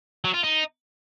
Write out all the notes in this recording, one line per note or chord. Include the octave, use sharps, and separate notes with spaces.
F#3
F4
D#4